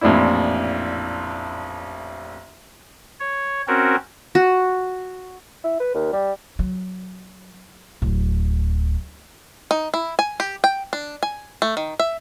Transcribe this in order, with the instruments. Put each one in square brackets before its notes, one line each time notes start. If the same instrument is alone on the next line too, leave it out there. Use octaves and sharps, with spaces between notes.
[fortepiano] A1 F2 A#2 D4 E4
[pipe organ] C#5
C4 C#4 F#4 A#4
[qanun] F#4
[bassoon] E4
B4
D#2
G3
[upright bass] F#3
D1
[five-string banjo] D#4
E4
G#5
G4
G5
D4
G#5
A3
D#3
E5